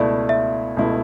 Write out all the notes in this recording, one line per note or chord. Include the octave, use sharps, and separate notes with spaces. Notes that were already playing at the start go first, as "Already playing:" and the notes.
Already playing: C#2 B2 A3 E4 D5
E5
C#2 B2 A3 E4